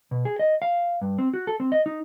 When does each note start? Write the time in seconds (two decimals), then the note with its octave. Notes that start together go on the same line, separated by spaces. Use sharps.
0.11 B2
0.25 G#4
0.39 D#5
0.62 F5
1.01 G2
1.18 C4
1.34 F#4
1.47 A4
1.60 C4
1.72 D#5
1.86 D#4